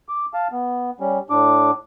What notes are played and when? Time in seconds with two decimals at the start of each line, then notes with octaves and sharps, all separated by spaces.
0.09 D6
0.34 F5 A5
0.52 B3
1.00 G3 C#4
1.30 A2 D4 D6